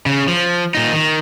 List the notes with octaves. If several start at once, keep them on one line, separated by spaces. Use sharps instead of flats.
C#3
F3
A#2 D#4
D#3